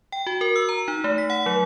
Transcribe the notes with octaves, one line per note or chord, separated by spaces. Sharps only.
G5
F#4
A#4
E6
A#5
D#4
A3
B6
F#5
F#3